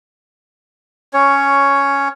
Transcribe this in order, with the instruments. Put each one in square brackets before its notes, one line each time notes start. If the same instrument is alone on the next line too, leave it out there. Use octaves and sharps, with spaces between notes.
[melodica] C#4 C#5